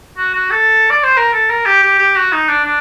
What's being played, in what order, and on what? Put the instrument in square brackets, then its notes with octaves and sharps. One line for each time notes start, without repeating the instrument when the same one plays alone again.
[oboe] F#4
F#4
A4
D5
C5
A#4
A4
A#4
G4
G4
G4
F#4
D#4
D4
D4